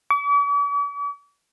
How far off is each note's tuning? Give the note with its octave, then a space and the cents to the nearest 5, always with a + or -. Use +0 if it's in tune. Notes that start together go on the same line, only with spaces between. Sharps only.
D6 -45